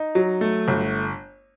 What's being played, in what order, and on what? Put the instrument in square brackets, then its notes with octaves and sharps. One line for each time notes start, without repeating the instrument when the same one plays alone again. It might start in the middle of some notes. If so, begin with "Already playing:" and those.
Already playing: [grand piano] D#4
F#3
A3
G1